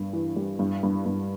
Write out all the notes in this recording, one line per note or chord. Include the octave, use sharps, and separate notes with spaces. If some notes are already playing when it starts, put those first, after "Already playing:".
Already playing: G2
E3
G3
G2
G2
G2